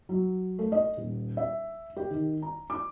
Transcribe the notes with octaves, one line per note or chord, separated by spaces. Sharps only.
F#3
A3
D#5
D#1
E5
G4
D#3
A#5
D6